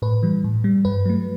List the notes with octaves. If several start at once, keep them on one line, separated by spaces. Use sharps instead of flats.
A2 B4
E3 G3
A2
G3
G2 B4
F#3 A3